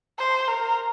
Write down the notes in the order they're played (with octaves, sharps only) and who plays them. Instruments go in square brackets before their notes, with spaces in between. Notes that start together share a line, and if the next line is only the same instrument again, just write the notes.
[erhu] C5
A#4